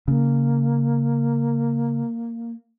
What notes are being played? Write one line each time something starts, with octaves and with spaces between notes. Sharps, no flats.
C#3 A#3